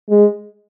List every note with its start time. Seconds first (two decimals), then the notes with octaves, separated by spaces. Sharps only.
0.10 G#3